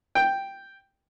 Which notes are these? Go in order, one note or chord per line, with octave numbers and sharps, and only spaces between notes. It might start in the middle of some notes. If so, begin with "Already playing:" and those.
G5